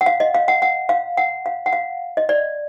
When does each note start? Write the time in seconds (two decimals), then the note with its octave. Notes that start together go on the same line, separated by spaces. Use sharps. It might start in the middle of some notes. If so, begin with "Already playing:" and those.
0.01 F#5
0.06 F5
0.20 D#5
0.35 F5
0.48 F#5
0.62 F#5
0.89 F5
1.17 F#5
1.46 F5
1.66 F#5
1.73 F5
2.17 D#5
2.29 D5